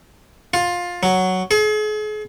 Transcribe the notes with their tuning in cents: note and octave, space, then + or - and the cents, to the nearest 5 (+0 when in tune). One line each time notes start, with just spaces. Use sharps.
F4 +15
F#3 +5
G#4 +40